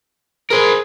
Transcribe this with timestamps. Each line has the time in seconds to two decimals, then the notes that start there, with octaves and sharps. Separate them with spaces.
0.50 G#4 A#4 C5